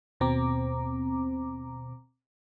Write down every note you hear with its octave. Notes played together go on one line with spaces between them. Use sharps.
D#2 B2 C4 A#5 D6